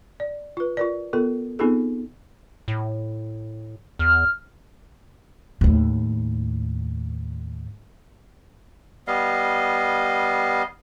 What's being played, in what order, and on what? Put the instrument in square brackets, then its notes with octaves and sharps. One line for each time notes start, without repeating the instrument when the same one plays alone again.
[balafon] D5
F4 B4
F4 A#4 D5
B3 F4 A4 A#4
B3 C4 D#4 F4 G#4 A4
[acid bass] A2
[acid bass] E2 [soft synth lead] F6
[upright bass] D#2 A2
[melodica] G3 B3 D#5 F5